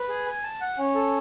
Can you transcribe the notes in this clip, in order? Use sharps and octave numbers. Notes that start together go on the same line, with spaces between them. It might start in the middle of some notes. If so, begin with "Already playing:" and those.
Already playing: B4
G#4
G#5
A5
F#5
C#4
A4